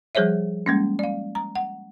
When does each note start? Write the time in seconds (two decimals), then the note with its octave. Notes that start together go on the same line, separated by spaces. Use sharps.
0.15 F3 G3 G#4 C5 C#5 E5
0.66 G3 G#3 A#3 C#4
0.99 D5 F5
1.35 A#5
1.55 F#5